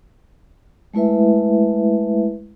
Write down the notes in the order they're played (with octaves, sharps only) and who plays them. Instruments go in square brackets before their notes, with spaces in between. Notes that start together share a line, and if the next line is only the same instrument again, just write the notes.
[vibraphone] G#3 A3 E4 B4 E5